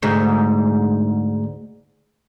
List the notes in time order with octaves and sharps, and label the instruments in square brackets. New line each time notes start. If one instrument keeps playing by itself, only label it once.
[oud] D2 G#2